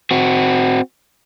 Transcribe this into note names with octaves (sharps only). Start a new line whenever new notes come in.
C4 F#4